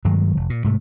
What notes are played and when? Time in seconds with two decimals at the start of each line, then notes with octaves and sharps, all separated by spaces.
0.05 G2 D#3 F#3 G#3
0.37 F1
0.50 A#2
0.64 G#2 C3 A3